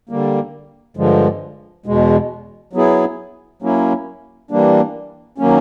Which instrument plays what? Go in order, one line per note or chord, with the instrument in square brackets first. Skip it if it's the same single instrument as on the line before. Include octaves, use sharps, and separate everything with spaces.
[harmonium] D3 G3 A#3
G2 D3 F3 G#3
E2 B2 G#3
F#3 B3 E4 G#4
F#3 A#3 C#4 E4
E3 G3 A#3 D4
D#3 F#3 A#3 C#4